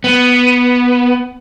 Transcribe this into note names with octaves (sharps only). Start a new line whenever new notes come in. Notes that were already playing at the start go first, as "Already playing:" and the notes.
B3